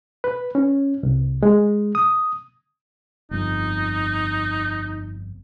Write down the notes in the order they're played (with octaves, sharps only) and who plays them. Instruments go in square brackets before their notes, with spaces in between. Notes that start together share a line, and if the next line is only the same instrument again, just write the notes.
[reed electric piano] B4
C#4
C2
G#3
D#6
[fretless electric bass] G1 F2 [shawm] D#4